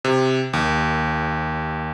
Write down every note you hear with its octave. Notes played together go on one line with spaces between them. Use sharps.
C3
D#2